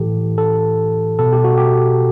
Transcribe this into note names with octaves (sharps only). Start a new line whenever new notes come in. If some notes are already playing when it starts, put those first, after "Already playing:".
Already playing: A2 E3 G4 A4
A4
B2 A4
G4
F#4
G4